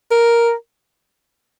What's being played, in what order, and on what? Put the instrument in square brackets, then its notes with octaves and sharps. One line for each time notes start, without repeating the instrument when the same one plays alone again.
[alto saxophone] A#4